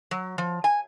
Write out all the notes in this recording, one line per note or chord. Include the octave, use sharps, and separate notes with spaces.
F#3
F3
G#5